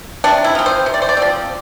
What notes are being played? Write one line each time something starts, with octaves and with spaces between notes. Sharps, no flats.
C3 D4
E4
F3 C4
C5
C3
D5
C5
D5
F3 C4